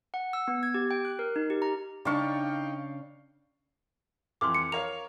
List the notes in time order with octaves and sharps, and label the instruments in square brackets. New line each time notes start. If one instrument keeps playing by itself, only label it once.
[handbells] F#5
E6
B3
G#6
G4
G5
F#6
A#4
D#4
G4
A#5
[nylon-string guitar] C#3 D4 [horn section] D#4 G5 [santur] D5 F5 C#6
[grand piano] F2 E3 F6 [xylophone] C6 D6
[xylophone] C#7
[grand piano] A#4 C#5 F5 [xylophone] F7